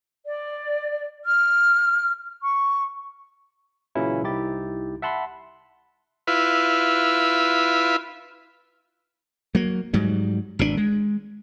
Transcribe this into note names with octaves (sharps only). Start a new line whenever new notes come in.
D5
F6
C#6
A#2 C#3 E3 F#3 C#4 E4
C2 D#4 E4 G4 A6
E5 F#5 A5 B5 C6
E4 F4 B4
F#3 A#3
G#2 F#3 G3
G#1 B2 D3 D4
G#3